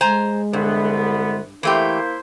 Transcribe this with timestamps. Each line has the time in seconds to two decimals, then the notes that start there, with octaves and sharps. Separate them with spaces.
0.01 G#3 C5 G#5 A#5
0.53 C2 G2 D3 B3
1.63 E3 A3 A#3 E4 G4 C5